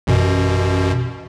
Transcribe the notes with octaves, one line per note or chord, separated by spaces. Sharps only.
A1 F#2 B2